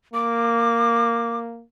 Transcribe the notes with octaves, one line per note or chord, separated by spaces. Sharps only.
A#3 D6